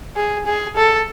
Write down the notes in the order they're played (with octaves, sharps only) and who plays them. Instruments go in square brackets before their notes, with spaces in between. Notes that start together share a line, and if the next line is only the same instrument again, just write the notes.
[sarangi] G#4
G#4
A4